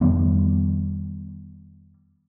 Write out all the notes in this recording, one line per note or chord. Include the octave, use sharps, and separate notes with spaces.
F2 D#3 G3 B3